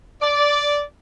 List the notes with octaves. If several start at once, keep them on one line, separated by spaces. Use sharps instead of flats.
D5